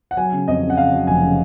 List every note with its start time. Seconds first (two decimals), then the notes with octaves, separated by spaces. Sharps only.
0.11 F#5
0.17 F#3 G#5
0.32 C#3
0.48 F2 D#5
0.63 C#3
0.70 F#5
0.77 C#3 F5
0.92 F#3
1.07 F1 G#5
1.22 C#3